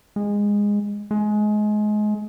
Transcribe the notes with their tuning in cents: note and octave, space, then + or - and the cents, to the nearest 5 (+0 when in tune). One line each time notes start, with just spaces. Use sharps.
G#3 -15
G#3 +25